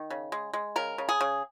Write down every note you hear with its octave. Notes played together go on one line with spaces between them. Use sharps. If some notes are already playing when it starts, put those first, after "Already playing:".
Already playing: D#3
C#3
G#3
G#3
C#3 A#4
C#3
G#4
C#3